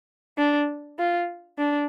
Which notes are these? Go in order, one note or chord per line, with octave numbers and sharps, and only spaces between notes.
D4
F4
D4